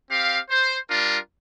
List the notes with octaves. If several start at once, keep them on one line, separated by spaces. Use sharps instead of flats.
C4 G4 F5
C5
G3 D4 F4 A#4